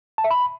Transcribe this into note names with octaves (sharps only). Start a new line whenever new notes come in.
A5
E5
B5